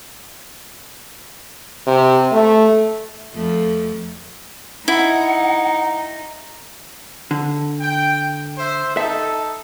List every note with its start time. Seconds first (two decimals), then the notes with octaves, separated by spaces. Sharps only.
1.87 C3
2.33 A3
3.33 F2 F3 A3
4.88 D#4 E4 F#5
7.31 D3
7.81 G5
8.58 C5 E5
8.97 D#4 A4 E5